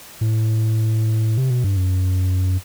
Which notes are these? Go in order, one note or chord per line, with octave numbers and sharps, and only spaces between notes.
A2
C3
B2
G2
F#2